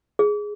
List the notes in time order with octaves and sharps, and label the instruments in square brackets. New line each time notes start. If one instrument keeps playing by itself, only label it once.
[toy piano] G#4